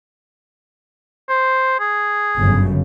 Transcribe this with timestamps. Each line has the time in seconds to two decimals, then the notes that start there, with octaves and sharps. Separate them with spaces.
1.29 C5
1.80 G#4
2.38 G1 F#2 C#3